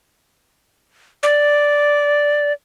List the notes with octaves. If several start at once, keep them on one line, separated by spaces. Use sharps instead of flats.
D5